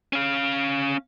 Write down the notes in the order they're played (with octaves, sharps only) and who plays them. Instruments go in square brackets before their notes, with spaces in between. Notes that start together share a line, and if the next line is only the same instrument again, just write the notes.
[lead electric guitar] C#4 F5